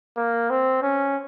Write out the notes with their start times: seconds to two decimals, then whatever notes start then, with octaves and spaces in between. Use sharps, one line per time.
0.17 A#3
0.50 C4
0.83 C#4